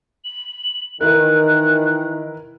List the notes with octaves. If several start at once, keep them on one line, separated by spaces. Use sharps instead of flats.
F#7
D#3 E3 E4 A#4 F#6